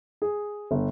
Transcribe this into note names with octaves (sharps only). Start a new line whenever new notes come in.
G#4
G1